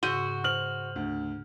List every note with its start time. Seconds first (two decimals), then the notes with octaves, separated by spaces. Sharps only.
0.03 G#2 C#3 F#4 E6 G6 D#7 G7
0.44 C5 F6 F#7
0.96 D2